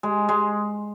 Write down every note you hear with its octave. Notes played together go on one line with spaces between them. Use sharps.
G#3
G#3